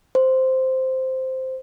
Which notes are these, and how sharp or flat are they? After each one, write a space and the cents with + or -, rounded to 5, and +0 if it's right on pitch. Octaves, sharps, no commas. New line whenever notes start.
C5 -5